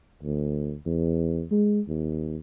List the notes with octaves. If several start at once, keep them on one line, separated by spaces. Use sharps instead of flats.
D2
E2
G#3
D#2